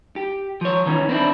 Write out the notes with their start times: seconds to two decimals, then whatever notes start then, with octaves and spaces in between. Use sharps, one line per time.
0.16 G4
0.61 F3 C#5
0.86 D#3 E3 C#4
1.09 C4 D4 E4